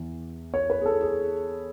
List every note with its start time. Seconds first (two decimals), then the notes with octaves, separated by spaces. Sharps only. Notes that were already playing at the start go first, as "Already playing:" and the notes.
Already playing: E2 E3
0.54 C#5
0.70 B4
0.82 G#4
0.86 A4
1.02 G#4